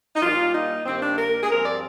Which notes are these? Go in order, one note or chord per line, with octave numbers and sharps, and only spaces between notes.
D#4
A#2 G3 A#3 F4
D#4
G2 D#3 A#3 C4
D4
A#4
G#4
G2 F3 C4 A#4
D5